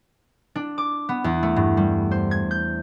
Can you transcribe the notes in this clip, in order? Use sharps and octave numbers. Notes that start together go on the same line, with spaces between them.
D4
D6
B3
E2
A3
G2
G3
C5
G#6
G6